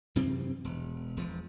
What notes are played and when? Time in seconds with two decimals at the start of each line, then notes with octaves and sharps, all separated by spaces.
0.16 F#2 C3 E3 C4
0.65 E1
1.17 E1 F3